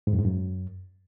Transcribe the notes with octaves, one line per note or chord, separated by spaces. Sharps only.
G#2
F#2
G#2
F#2